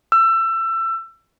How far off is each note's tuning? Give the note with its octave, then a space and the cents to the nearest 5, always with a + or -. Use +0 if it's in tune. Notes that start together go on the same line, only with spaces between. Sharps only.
E6 +25